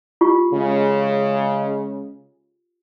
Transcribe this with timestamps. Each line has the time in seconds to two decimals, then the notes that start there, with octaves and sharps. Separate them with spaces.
0.21 F4 G4
0.52 C#3 G#3